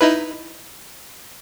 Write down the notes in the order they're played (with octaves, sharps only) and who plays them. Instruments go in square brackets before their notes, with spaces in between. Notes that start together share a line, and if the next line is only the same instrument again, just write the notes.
[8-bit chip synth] D#4 E4 B4